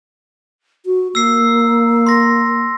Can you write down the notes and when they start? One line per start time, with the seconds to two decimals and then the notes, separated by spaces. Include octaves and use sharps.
0.86 F#4
1.15 A#3 E6 C7
2.07 C6 A#6